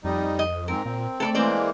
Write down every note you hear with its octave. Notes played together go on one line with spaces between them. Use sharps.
F2 G3 D#4
D#5
G#2 C4 A#4
A#2 C4
A3 A4 A#4 D5
E3 G#3 A#3 C4 C5 D5